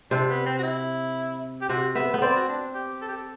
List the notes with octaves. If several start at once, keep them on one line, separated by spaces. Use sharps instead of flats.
C3 D4
B3
C4
F#4
E4
G4
C3 F#4
B3 E5
B3
C4 D5
F#4
D4
G4
A4
G4
A4